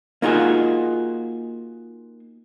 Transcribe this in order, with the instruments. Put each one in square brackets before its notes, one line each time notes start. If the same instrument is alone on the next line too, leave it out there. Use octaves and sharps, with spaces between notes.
[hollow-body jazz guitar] A#3 D#4 F4 F#4 G#4